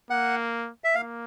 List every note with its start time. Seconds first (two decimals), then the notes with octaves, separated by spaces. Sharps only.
0.10 A#3 F#5
0.84 E5
0.95 A#3 F5